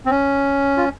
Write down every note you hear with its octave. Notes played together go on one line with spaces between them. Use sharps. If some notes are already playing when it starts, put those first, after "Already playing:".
C4
C#4
F4